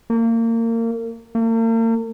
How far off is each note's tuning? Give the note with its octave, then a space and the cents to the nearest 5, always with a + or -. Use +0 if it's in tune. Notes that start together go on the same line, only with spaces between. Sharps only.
A#3 -30
A#3 -45